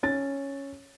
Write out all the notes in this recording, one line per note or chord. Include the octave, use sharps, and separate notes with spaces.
C#4 A6